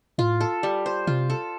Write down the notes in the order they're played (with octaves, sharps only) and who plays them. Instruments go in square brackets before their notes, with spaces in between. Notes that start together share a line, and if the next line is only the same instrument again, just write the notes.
[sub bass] A2 [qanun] F4
[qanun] A4
G3
C5
[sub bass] C3 [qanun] F4
[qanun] A4